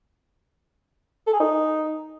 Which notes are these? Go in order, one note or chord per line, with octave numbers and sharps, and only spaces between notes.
A4
G#4
D#4